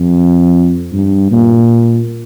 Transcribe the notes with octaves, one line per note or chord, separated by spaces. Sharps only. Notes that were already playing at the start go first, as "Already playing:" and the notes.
Already playing: F2
G2
A#2